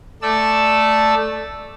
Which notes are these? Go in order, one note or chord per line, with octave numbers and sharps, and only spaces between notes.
A3 A4 D5 E6